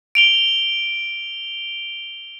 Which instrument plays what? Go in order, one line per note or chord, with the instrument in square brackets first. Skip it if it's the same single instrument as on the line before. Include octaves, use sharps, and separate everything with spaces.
[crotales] D7 F7 G7